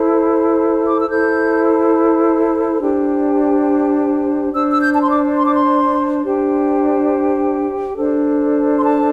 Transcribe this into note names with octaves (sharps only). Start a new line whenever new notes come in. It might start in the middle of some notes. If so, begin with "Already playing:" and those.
Already playing: E4 A4 C5
D6
E6
E4 A4 C5 G6
D4 G4 C5
D4 C5 E6
E6
G6
A5
C6
D6
C6
D6
C6
D4 G4 C5
D4 A4 C5
C6
A5